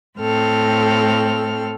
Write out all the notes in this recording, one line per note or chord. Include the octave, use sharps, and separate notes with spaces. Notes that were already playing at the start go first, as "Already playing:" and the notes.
A2 C4 A4 F6